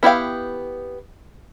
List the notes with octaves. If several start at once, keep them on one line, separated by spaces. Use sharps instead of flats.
B3 E4 G4 F5